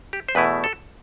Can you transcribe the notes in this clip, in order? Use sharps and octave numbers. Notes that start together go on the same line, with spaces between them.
G4
C5
E2 B2 A3 E4 B4
A4